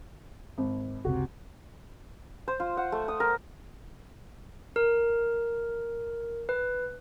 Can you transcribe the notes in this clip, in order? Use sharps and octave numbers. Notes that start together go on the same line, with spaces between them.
G#1
F#1 C#2 C3 F#4
C5
F4
F#5
A3
D#6
A#4
A#4
B4